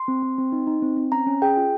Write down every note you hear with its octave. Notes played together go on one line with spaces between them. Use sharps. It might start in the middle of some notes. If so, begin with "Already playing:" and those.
Already playing: C6
C4
C4
C4
D#4
D#4
C4
C4
C#4 A#5
C#4
G#4 G5
F4